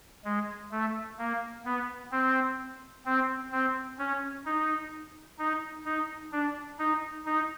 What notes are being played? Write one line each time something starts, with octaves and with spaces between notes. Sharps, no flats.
G#3
A3
A#3
B3
C4
C4
C4
C#4
D#4
D#4
D#4
D4
D#4
D#4